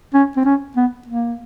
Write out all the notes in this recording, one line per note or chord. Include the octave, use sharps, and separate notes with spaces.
C#4
C4
C#4
B3
A#3